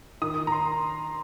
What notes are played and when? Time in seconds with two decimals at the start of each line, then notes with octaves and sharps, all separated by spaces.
0.22 D#3 D#6
0.47 A#5
0.52 C6